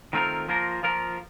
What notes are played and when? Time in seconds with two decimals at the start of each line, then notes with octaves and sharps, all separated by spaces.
0.13 D#3 A3 C4 F4 A#4
0.48 F3 A#3 F4 A#4
0.83 F3 A#3 F4 A#4